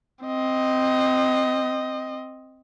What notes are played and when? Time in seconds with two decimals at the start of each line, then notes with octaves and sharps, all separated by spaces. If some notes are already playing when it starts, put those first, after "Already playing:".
0.24 C4 D#5